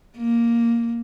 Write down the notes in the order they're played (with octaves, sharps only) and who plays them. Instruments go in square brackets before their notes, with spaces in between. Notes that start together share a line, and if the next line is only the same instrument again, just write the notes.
[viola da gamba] A#3